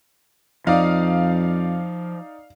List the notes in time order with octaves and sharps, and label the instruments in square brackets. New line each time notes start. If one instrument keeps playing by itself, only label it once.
[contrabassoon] F2 [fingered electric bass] F3 [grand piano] D#4 D5 [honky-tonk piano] F5